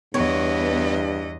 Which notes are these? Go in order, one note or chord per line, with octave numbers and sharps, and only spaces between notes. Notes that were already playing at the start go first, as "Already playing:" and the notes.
E2 G2 B3 C#5 D#5